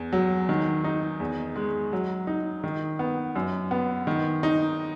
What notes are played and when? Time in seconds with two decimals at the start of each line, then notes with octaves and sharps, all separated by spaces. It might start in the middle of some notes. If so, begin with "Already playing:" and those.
Already playing: E2
0.13 F#3
0.49 D#3
0.84 D#4
1.20 E2
1.56 G#3
1.93 F#3
2.27 D#4
2.64 D#3
2.99 B3
3.36 F#2
3.71 B3
4.07 D#3
4.43 D#4